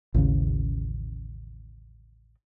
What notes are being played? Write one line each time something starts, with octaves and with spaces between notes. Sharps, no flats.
A1 D#2 C#3